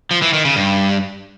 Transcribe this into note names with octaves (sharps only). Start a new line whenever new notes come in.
F3
E3
D#3
C#3
G2